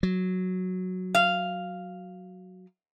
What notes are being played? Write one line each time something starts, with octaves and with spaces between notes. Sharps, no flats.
F#3
F5